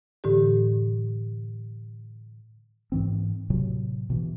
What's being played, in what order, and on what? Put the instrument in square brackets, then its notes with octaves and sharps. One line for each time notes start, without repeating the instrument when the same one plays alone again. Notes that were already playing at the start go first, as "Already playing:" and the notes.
[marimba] A2 D3 E3 G4
[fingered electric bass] G#2 E3 C4
A2 C3 F#3
B2 E3